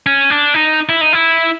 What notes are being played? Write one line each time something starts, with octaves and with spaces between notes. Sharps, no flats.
C#4
D4
D#4
E4
D#4
E4